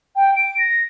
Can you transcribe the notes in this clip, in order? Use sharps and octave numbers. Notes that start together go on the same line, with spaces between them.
G5
D7
A#6